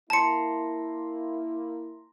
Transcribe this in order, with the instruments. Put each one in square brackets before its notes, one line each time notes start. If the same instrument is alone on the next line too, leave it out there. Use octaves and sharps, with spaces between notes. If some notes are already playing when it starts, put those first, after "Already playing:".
[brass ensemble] A#3 E4 [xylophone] A5 C#7 [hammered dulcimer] A#5 C6